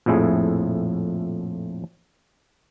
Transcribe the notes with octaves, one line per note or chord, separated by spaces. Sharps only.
A#1 F2 A2 E4 G#4